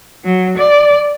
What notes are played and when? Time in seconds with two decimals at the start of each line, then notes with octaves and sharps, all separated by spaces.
0.25 F#3
0.57 D5